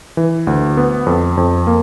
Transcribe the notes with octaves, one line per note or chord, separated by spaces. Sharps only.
E3
D2
B3
F2
F2
A#3